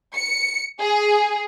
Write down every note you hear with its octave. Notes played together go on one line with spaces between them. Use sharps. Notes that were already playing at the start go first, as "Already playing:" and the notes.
C#7
G#4